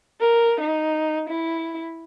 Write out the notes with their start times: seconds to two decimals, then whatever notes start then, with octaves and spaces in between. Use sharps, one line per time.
0.20 A#4
0.59 D#4
1.28 E4